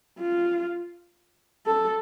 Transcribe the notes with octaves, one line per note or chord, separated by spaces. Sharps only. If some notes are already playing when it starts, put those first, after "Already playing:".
F4
A4